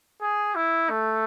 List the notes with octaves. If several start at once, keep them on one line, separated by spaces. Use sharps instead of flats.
G#4
E4
A3